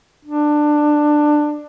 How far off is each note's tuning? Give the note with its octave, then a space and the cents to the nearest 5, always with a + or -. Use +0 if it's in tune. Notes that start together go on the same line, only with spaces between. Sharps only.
D4 +15